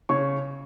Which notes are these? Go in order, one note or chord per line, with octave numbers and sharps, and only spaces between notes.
C#3 C#5 C#6